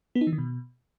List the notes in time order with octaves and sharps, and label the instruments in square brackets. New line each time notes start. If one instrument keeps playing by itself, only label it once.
[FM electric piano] B3
D#4
E3
D#3
B2